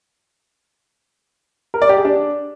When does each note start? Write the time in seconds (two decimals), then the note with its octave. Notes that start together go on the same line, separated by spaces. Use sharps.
1.74 A#4
1.82 D5
1.89 G4
1.97 G#4
2.05 D4